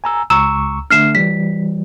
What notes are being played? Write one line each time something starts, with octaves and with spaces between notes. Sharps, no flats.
G#5 A#5 E6
C#2 A#5 C#6 E6 E7
D3 A3 D4 F6 C7 E7
E3 G3 B6